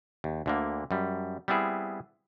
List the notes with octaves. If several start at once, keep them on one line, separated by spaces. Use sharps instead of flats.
D#2
D2 D3 A#3
F#2 G3
G3 B3 C4 E4 G#4